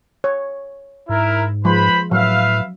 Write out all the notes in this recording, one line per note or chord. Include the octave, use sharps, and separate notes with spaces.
C#5
G#2 E4 A#4
F3 G#3 B4 C5 B5
A2 F#3 B4 E5 F5